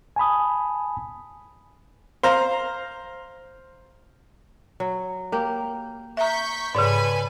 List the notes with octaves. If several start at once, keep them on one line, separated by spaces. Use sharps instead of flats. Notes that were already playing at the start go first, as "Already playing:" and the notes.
G#5 A5 B5 D#6
C5 F5 A#5
F#3
A#3 G4
E5 A#5 C#6 G6 B6
G#2 C#3 A4 B4 C#5 D5 G#5